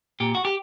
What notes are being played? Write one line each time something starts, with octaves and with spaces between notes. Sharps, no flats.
A#2 G4
F#4
G4